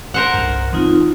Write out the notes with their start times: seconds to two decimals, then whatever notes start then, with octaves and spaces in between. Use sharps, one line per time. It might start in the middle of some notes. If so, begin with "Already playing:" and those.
0.14 A#4 C5 F#5
0.34 C2 G2
0.73 E3 A3 C4 D#4 F4